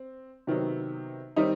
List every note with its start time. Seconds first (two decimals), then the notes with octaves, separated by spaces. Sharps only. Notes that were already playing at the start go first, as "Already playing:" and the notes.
Already playing: C4
0.47 C3 D#3 F#3 B3
1.36 D#3 G3 C4 D#4